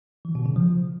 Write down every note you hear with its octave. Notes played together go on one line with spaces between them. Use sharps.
E3
B2
C#3
F3